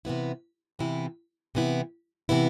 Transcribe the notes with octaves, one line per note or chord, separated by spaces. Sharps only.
C3 E3 B3 E4
C3 E3 B3 E4
C3 E3 B3 E4
C3 E3 B3 E4